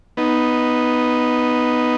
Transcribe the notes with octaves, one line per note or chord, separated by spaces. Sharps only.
B3 D#4